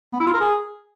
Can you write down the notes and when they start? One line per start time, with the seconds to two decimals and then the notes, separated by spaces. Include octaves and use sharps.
0.13 B3
0.20 E4
0.27 F4
0.34 A#4
0.40 G#4